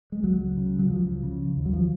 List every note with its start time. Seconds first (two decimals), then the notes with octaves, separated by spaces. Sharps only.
0.12 G#3
0.23 C#2 F#3
0.57 C#3
0.79 F#3
0.89 C#2 F3
1.23 C#3
1.56 D#2
1.66 F#3
1.73 F3